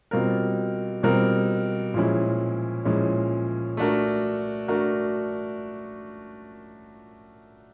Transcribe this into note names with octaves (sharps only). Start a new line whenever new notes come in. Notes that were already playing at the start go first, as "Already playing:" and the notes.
B2 G3 C4 F4 A#4
B2 G3 C4 F4 A#4
A#2 F3 G#3 C#4 E4
A#2 F3 G#3 C#4 E4
A3 D4 F#4 A#4
A3 D4 F#4 A#4